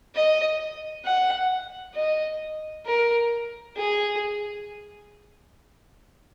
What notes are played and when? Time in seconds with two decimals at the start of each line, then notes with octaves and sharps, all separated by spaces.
0.15 D#5
1.04 F#5
1.95 D#5
2.85 A#4
3.76 G#4